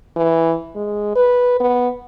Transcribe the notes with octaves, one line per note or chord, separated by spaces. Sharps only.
E3
G#3
B4
B3